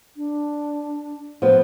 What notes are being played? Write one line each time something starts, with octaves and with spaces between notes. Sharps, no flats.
D4
F3 B3